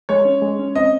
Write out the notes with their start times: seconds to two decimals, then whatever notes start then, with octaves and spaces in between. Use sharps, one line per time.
0.09 G#3 C#5
0.25 C#4
0.42 G#3
0.60 C#4
0.75 C4 D#5